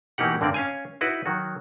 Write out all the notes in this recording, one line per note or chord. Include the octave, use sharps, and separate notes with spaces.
B2 E3 A#3 D#4 G4 F#5
G2 D3 A#3 C4 D5
C#4 F5 G#5
D#4 E4 F#4 B4
D#3 F#3 F#4